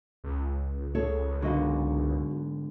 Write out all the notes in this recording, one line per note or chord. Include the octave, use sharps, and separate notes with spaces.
C#2
G#4 A4 C#5
G#2 D3 F#4 D#5 F5